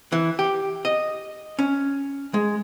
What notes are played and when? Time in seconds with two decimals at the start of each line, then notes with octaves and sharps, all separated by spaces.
0.12 E3
0.39 G4
0.85 D#5
1.59 C#4
2.34 G#3